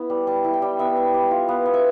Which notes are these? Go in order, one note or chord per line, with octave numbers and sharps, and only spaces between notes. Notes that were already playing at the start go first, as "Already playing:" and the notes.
Already playing: B3 E4
G3
G3 A5
E4
G5
G3
B3 E5
E4
G3
F4
B3
B3
E5